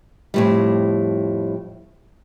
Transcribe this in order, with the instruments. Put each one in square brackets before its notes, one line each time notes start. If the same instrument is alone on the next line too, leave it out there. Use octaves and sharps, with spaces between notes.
[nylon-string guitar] F2 A2 G3